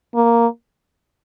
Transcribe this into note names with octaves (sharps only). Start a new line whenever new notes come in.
A#3